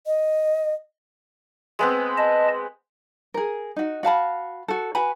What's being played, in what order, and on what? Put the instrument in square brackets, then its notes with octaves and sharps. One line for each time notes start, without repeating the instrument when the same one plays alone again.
[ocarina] D#5
[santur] G#3 B3 C4
[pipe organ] D#5 A5
[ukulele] G#4 A#4
D#4 F#4
F#4 F5 A5 B5
F#4 A4
F#4 B4 G#5 B5